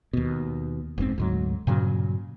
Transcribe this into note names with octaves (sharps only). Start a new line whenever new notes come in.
D#2 B2
F1 G#2 C3 C4
D2 G#2 F#3
G2 A#2 C#3 F#3